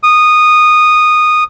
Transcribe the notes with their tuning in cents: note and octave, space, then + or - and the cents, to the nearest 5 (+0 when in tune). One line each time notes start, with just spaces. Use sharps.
D#6 -15